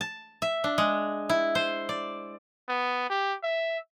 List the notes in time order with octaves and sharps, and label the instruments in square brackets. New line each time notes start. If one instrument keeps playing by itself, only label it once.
[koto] A5
E5
D4
G#3
E4
C5
D5
[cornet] B3
G4
E5